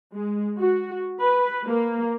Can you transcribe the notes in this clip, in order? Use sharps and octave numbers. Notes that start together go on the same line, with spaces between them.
G#3
F#4
B4
A#3